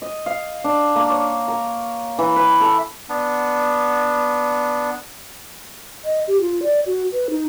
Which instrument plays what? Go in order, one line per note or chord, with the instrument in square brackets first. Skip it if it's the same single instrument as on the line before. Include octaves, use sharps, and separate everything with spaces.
[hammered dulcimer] D#5
F5
D4
A#3
C#5
A#4
E3
B4
A4
[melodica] B3 D4
[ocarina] D#5
G4
F4
D5
F#4
B4
D#4